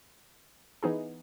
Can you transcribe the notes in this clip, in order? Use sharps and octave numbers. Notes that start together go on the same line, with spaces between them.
E3 B3 D#4 G#4